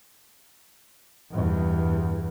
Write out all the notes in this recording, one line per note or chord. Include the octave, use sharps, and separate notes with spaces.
E2 G2